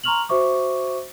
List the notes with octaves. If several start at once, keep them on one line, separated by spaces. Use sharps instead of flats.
A#5 C6 C#6 F6 F7 F#7
F#4 C5 E5 C#6 D6